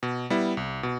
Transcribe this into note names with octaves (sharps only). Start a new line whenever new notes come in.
B2
G3 B3 E4
C2
B2